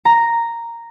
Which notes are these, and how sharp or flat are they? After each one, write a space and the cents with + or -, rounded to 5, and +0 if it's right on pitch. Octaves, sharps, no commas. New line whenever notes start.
A#5 -5